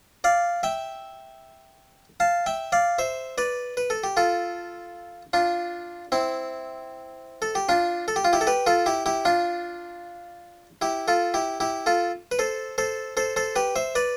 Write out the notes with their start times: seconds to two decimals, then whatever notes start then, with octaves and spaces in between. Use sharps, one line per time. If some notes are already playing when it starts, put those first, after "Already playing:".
0.24 D5 F5
0.63 E5 G5
2.20 F5 A5
2.46 E5 G5
2.72 D5 F5
2.99 C5 E5
3.38 B4 D5
3.77 B4
3.90 A4
4.04 G4
4.17 F4 A4
5.33 D4 F4
6.12 C4 E4
7.42 A4
7.55 G4
7.69 D4 F4
8.08 A4
8.16 G4
8.25 F4
8.33 E4 G4
8.41 A4
8.47 G4 B4
8.67 F4 A4
8.86 E4 G4
9.06 E4 G4
9.25 D4 F4
10.82 E4 G4
11.08 F4 A4
11.34 E4 G4
11.60 E4 G4
11.86 F4 A4
12.31 B4
12.39 A4 C5
12.78 A4 C5
13.17 A4 C5
13.36 A4 C5
13.56 G4 B4
13.76 C5 E5
13.95 B4 D5